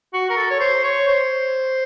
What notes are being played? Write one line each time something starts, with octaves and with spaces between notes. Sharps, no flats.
F#4
A#4
A4
C#5
C5
C#5
C5